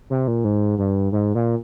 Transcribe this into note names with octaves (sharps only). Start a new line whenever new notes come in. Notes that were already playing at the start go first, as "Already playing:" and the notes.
C3
A#2
G#2
G2
G#2
A#2